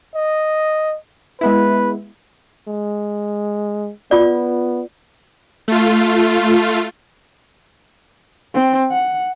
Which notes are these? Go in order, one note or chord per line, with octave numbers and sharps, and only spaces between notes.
D#5
G#3 B3 E4 B4
G#3
B3 F4 D5
A3 F4
C4
F#5